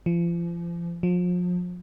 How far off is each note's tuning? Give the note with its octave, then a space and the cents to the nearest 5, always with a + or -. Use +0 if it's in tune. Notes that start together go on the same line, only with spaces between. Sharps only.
F3 -35
F3 +35